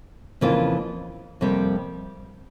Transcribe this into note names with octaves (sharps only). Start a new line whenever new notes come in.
F2 C#3 E3 A#3 F4
F2 C3 G3 A#3